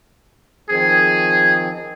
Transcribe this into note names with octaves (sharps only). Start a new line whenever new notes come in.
D#3 F3 C4 G#4